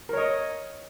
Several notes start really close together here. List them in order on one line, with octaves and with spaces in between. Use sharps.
A#4 C#5 D#5